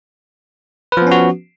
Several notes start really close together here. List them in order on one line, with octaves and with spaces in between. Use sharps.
B4 F3 B3 C#4 F#4